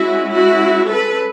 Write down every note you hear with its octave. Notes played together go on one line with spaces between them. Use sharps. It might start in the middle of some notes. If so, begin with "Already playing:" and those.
Already playing: G#3 C#4 E4 F#4
E4 F#4
A4 B4